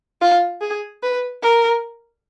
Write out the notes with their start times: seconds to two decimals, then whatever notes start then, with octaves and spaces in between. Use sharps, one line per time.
0.21 F4
0.61 G#4
1.03 B4
1.43 A#4